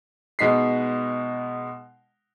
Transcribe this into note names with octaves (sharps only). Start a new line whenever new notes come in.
B2 G#3 D#4 B6 C7